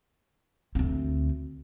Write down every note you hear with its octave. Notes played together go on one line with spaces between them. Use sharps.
D2 C4